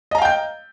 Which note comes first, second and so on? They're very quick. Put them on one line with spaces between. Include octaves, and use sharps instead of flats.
D#5 A#5 F5 G5 G6